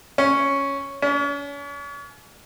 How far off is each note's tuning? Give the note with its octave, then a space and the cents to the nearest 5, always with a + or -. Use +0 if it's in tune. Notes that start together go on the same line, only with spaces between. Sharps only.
C#4 +0
C#4 +40